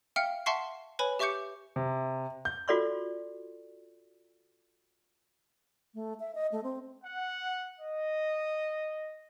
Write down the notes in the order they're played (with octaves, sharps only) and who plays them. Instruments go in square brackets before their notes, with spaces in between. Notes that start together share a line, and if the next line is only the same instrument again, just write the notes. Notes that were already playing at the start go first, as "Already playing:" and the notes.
[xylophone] E5 F5 G5 F6 C#7
E5 F#5 A5 C6 C#6 C7
B4 C#5 G#5 B5
G4 E5 C#6 D6 G6 C#7
[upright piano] C3
G6
[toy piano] F4 F#4 A4 D5 C6 C#6
[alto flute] A3
E5
D#5
A3
C4
[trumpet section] F#5
D#5